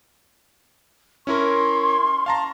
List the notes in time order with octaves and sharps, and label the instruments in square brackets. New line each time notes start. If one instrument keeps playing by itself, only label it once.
[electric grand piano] C#4 E4 A#4 [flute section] C6 C#6
[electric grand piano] F5 A5 A#5